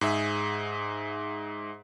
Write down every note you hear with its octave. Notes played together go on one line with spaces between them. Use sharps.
G#2 G#4 E5